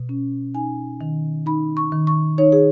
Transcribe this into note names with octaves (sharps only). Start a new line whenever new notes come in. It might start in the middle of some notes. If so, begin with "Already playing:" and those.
Already playing: B2
C#4
D#4 G#5
D#3
D#4 B5
C#6
D#3
C#6
D#4 C#5
G#4